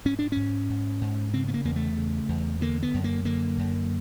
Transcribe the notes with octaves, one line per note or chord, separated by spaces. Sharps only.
G#2 C#4
D4
G#2 C#4
G#2
G#2
C#3 C4
B3
A#3
E2 A#3
A3
C#3
E2
D3 A#3
B3
F#2
A#3
D3 A#3
F#2